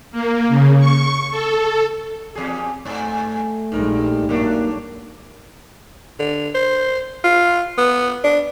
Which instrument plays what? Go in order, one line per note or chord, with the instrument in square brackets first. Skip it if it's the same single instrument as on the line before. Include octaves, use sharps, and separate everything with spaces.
[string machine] A#3
C#3
C#6
A4
[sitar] E2 G#4
[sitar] G2 [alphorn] A3
[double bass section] A#1 A#2 G#3 [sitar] G2 A#4 [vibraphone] D#4
[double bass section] G2 [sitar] F#3 A3 D4 [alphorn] A#3
[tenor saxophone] D3
C5
F4
B3
D4